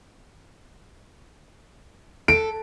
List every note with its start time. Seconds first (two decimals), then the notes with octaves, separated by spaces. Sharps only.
2.28 A4 D7